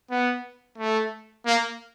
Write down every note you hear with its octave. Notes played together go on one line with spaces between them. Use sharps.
B3
A3
A#3